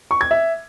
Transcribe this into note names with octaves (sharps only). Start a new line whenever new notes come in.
C#6
G#6
E5